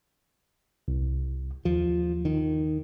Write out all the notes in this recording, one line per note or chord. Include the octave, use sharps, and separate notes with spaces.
C2
D#2 F3
D#3